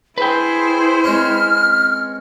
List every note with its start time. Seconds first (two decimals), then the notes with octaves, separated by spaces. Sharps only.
0.18 E4 G#4 B4 C5 G5
1.04 G#3 C4 C#4 F6